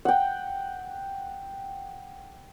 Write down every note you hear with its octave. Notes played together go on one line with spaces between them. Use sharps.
F#5 G5